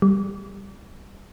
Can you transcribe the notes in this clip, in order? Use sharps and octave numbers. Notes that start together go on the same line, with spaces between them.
G3